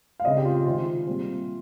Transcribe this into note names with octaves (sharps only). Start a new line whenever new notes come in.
F5
C#3 G#3 C4 D#5
G4
F4
C3 D#3 G#3 C4 F4
A#2 G3 C4